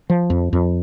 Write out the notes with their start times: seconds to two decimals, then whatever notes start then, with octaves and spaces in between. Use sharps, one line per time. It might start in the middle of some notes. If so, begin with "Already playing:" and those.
0.10 F3
0.30 F2
0.53 F2